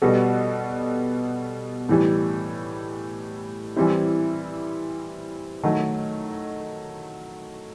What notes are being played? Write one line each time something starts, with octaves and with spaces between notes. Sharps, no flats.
B2 G3 B3 F#4 A4
A2 E3 G3
E3 G3 C4 E4
D#3 F#3 A3